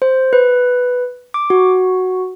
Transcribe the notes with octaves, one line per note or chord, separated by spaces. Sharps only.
C5
B4
D6
F#4